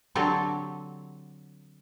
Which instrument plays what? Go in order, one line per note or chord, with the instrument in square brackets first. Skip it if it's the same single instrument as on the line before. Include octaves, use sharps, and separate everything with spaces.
[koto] D3 F#3 C4 G4 A4 C#5